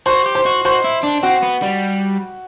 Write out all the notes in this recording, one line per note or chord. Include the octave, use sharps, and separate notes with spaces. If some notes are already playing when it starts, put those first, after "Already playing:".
F#4 C5
G4
C5
F#4
F#4 C5
E4
D4
C4 F#4
B3
G3